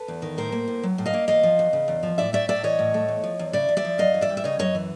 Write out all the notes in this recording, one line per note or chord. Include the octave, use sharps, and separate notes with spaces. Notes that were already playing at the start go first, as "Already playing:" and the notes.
Already playing: A4 B4
E2
D#3
A2 A#4 C5
A#3
A2
F#3
A2
D#5 F5
A#3
E2 D#5 F5
F3
E2
C#3
E2
F3
A2 D5 E5
A3 D5 E5
A2 D5 E5
E3 C#5 D#5
A2
A3
E2
F3
E2
C#3 D5 E5
E2
D5 E5
F3
F#2 D#5 F5
E3
D5 E5
G3
E5
C#3 C#5 D#5
F#2 C#5 D#5
E3